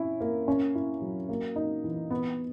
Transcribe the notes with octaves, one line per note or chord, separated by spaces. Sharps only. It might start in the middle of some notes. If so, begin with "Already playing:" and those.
Already playing: C#4 E4
A#3
C#4
E4
F#3
A#3
D#4
E3
B3